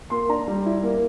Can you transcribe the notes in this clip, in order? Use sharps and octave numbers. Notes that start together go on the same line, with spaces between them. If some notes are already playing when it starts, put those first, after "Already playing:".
A#3 C6
D4 A#5
G3
E4
A#3